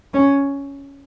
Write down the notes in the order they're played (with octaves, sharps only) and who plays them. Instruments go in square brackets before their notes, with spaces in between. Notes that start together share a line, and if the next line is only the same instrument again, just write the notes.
[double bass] C#4